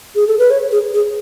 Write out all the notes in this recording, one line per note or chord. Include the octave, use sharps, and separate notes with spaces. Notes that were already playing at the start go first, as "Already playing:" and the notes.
G#4
A4
B4
C#5
G#4
G#4